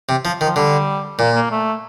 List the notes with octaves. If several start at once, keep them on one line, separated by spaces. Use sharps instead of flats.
C3
F3
D#3
F3
D3 G3
A#2 A#3
A#3
A3